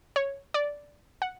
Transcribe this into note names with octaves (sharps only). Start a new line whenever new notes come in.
C#5
D5
F#5